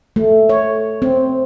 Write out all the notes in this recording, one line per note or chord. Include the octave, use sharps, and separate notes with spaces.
A3
C#5
C4